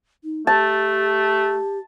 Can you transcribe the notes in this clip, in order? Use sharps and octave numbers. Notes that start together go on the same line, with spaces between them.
D#4
A3 G4 A5